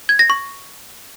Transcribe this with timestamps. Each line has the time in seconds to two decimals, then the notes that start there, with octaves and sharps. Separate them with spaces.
0.09 G#6
0.19 A#6
0.30 C#6